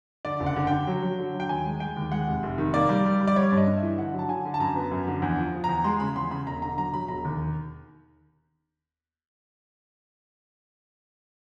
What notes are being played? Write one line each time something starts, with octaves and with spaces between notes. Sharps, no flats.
D3 D5
F#1
F#5
D3
D3 G5
F#3
F#3
D3
F#3
G5
D#2 G#5
G#3
G#3 G5
D#2
G#3 F#5
F1
F1
D#3
A#3 D5
G3
G3
G3
D5
G3 C#5
G2
D#5
G2
E5
E3
D3 F#5
F#3
A5
D3 G#5
D3
A5
F#2 A#5
B3
F#2
D3
E2
F3
F3
E2 A#5
G#3 C6
C#3 B5
E2 C6
C#3 B5
E1 A#5
D3 A#5
F#3 A#5
F#3 B5
E1 A#5
D#2